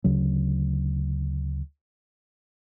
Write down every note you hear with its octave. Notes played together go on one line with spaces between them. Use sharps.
D2 C#3 F#3